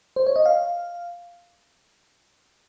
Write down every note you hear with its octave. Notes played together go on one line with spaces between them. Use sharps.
C5
C#5
D#5
F5